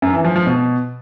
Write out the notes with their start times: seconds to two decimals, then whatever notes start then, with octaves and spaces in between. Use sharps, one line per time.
0.02 F#2
0.13 E3
0.24 F3
0.36 F3
0.47 B2